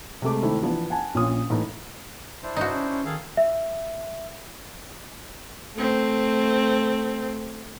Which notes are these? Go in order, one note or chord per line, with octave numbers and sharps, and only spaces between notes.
C3 G#3 A3 D6
D#3 A3 C4 E4
E3 F3 B3 D4 B4
F#5 G#5 A5
A#1 A#2 C#4 F4 D#6
A2 E3 A#3 D#4
D4 E4 C5
G2 D#4 F#4
C#4
C#4
D#3 G#4 A4 F5
E5
A3 C4